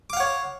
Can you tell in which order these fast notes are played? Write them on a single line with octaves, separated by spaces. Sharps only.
D6 F5 F#5 C#5